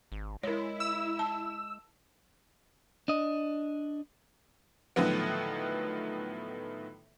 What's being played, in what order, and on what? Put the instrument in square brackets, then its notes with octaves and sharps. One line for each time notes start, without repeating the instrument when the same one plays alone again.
[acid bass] G#1
[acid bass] G#3 [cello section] E4 [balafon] A#4 C#5
[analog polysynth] E6
[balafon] A5
[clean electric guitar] D4 D#5
[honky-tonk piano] A2 D3 D#3 F3 F#3 B3